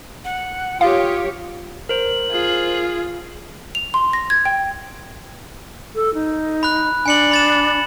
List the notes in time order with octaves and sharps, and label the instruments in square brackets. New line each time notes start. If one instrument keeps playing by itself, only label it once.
[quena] F#5
[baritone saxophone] F4 [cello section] G4 C#5 [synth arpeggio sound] F5 [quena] D#6
[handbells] A#4 C5 [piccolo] F#7
[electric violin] F4 G#4
[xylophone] F7
C6
A#6
G#6
G5
[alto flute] A4
D#4
[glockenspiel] B5 F#6
[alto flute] D4 [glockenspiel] G#5 C#7 F#7
[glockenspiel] B5 A6 E7